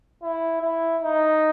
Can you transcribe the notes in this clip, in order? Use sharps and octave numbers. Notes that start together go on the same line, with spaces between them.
E4
E4
D#4